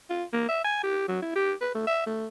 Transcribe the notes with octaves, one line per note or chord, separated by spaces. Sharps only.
F4
A#3
E5
G#5
G4
F#3
E4
G4
B4
A3
E5
A3